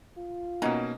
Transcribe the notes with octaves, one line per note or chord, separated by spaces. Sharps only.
F4
B2 F#3 A#3 C#4 D#4